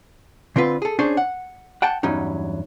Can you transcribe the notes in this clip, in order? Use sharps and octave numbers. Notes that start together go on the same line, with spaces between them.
D3 C4 F4 B4
G#4 A4
C#4 D4 G#4 C5 C#5
F#5
F#5 G5 A5
E2 G2 F#3 C#4 D#4